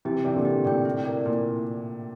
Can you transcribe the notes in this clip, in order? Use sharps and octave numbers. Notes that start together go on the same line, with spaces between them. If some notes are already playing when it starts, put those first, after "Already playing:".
C3 E3 G4
C3 E3 D5 G5
A#2 D3
G4
A2 C3 D5 G5
E4
A#4 D5
A#2 E4